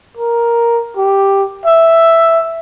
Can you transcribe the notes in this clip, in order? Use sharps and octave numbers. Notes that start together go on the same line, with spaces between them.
A#4
G4
E5